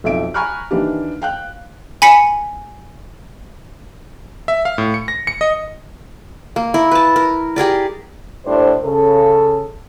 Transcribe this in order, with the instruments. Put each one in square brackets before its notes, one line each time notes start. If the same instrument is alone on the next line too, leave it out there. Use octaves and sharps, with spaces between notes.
[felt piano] B1 F2 E5 D7
G#5 A#5 B5 C#6 F6 F#6
D#3 E3 A#3 D4 G4
F5 G5 F#6
[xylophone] G#5 B5 B6 C#7
[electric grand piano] E5
F5
A2
C#7
A#6
C#7
D#5
[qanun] A#3
E4 A#4
B4 A5
A#4
G4 G#4 A#4 D5
[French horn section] A2 G3 D4 C5
C#3 A4